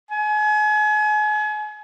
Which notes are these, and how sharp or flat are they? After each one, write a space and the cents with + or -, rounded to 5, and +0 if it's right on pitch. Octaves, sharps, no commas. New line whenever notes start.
G#5 +35